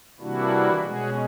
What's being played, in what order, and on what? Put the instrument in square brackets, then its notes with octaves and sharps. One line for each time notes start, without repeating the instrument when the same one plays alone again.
[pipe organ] C3 E3 G3 A#3 D4 E4 F#4
B2 G#3 C#4 F#4 G#4